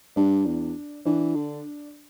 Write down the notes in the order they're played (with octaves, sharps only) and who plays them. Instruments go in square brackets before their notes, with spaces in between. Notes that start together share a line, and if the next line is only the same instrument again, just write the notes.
[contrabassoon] G2 [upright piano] D4
[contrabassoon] E2
[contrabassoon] E3 [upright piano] D4
[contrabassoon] D3